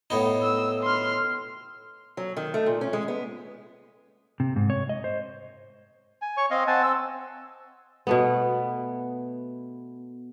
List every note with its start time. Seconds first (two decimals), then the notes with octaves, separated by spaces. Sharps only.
0.10 A2 B3 D#4
0.43 E6
0.83 C6 F6
2.17 F#3
2.37 D#3
2.54 A3
2.66 A#2
2.81 C#4
2.93 G#3
3.08 B3
4.40 C3
4.56 G#2
4.70 C#5
4.89 D#5
5.04 C5
6.22 G#5
6.37 C#5 C#6
6.51 C4 D#5 F5
6.67 C4 F#5 G#5 A5
6.83 C4 E6
8.07 B2 A3 B3